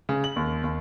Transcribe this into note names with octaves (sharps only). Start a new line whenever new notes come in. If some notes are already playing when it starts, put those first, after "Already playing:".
C#3
F#7
D#2
D#2